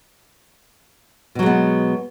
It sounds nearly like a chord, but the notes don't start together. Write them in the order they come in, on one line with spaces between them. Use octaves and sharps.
B2 F#3 G#3 B3